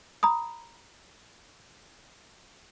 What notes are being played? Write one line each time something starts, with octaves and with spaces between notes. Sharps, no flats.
A#5 B5 D#6